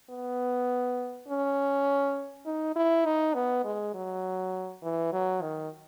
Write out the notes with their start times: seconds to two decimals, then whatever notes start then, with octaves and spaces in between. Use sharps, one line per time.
0.10 B3
1.28 C#4
2.46 D#4
2.76 E4
3.05 D#4
3.34 B3
3.65 G#3
3.94 F#3
4.83 E3
5.13 F#3
5.42 D#3